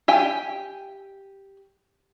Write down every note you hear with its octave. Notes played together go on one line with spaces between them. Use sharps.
G4 G5 G#5